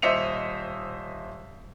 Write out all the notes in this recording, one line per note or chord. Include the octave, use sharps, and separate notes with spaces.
D#1 C5 D#5 E5 C#7 F7